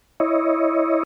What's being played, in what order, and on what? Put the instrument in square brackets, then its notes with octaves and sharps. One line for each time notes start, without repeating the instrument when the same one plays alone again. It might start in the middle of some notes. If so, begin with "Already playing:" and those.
[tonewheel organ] E4 C#5 D#5